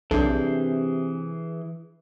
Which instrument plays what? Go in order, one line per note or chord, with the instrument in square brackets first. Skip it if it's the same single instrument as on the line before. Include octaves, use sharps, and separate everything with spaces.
[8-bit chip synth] B1 [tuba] C3 [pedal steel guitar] E3 G#4 G6 [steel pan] D4 A4